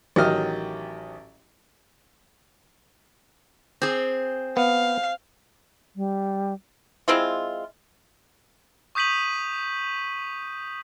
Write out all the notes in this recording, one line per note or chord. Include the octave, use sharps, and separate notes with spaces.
A1 D#3 F#3 G4 D#5 F6
C4 G#4
B3 F5
G3
G#3 C4 E4 F4
C#6 D#6 G6 B6 D#7 F#7